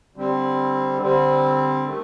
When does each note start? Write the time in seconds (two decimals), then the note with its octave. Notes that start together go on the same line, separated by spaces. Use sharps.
0.16 D3 G3 C4
1.01 D3 G3 C4
1.87 D#3 A3